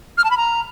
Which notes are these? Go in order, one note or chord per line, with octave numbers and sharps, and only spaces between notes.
F6
A5
B5
A#5